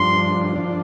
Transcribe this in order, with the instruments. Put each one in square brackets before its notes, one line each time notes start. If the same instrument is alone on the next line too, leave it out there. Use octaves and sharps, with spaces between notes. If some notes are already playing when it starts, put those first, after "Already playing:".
Already playing: [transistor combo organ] G2 F3 D4 [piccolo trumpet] C6
[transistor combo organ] F3 D4